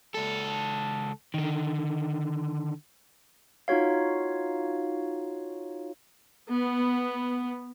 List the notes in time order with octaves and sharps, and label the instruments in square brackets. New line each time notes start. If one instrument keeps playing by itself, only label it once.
[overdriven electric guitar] C#2 A4
D3 D#3
[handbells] D#4 F4 F#4 C#5 F5
[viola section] B3